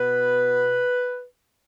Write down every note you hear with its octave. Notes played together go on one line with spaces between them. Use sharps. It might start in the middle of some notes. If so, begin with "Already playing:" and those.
Already playing: B2 B3 B4